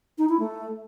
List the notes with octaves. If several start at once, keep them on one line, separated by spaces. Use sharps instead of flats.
D#4
E4
A3